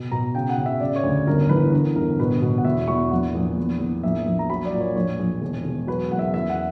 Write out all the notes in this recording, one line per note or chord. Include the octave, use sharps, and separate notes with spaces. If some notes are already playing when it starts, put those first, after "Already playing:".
Already playing: B2
B2 A#5
C#3 G5
F#5
C#3
E5
C#3 D5
C#5
D2
G1 A#4
E3 B4
D3 A#4
G1 A#4
B2 B4
B2
F#5
E2 E5
E2 C#6
A#1 F#5
A#1
E2
E2
A#1 E5
A#1
A#5
F#3 B5
D5
A#2
C#5
A#1 C#5
A#1
E1
E1
F#3 B4
F#1 F#5
E5
E2 E5
F#5